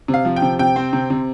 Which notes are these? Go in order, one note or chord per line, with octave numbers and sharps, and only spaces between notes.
C3
F5
F3
G5
C3
C3 G5
C4
C3
C3